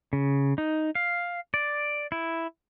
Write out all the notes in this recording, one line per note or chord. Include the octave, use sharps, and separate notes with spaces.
C#3
D#4
F5
D5
E4